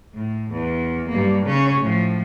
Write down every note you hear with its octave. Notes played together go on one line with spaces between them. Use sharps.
A2
E2
G2 A#3
C#3 C#4
A2 F3